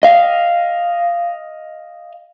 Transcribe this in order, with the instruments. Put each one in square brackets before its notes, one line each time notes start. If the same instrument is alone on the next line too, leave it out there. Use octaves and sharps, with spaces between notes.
[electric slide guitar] D#5 F5